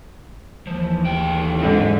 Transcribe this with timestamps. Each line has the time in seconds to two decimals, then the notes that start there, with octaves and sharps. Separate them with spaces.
0.67 D#2 E3 F3
1.05 D2 G5
1.59 G#2 D3 F#3 C4